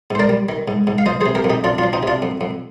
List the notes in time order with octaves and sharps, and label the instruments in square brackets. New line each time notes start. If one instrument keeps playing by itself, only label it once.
[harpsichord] G#2 C5
A#4 D5
G3
D#3
G#2
G#2
F5
F3 C5 D#5
C3 G#4 C5
G4 A#4
F2
D#4 G4
F2 D4 F4
F3 D4 F4
C4 D#4
C3 D4 F4
F2
F2